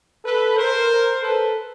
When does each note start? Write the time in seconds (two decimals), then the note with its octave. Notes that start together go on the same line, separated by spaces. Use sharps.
0.24 A4 B4
0.56 A#4 C5
1.22 A4 B4